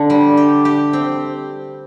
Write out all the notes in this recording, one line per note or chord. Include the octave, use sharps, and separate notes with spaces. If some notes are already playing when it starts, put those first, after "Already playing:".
Already playing: D3
G3
G4
G4
C4